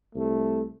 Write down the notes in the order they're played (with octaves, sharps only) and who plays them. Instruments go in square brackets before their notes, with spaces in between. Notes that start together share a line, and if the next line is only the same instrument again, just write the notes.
[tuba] C2 [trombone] A3